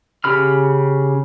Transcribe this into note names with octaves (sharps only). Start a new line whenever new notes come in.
C#3 G4 B5 F6